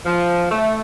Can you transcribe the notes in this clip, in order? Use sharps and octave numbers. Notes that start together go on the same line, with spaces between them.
F3
A3